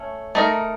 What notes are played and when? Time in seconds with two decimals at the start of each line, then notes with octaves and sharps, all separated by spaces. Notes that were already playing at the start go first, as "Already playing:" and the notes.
Already playing: A3 C#4
0.35 A3 D#4 A#4